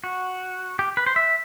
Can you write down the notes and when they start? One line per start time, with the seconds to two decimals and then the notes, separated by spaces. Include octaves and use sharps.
0.04 F#4
0.79 G4
0.97 B4
1.06 C5
1.16 E5